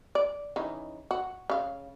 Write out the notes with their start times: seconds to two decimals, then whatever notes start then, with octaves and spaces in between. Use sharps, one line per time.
0.15 D5
0.56 C#3 E3 D#4
1.11 F#4
1.50 C#3 F5